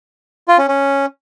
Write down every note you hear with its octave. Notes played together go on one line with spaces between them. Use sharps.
F4
C#4
C#4